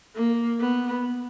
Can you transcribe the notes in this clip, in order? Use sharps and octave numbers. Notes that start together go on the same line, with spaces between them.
A#3
B3